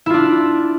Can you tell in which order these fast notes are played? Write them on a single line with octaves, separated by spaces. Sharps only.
E4 F4 D4